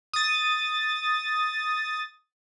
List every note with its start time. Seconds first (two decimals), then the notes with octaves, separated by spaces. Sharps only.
0.13 D#6 A6